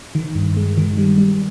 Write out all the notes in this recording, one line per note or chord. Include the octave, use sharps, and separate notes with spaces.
D#3
G2
G#3
D#3
G3
G3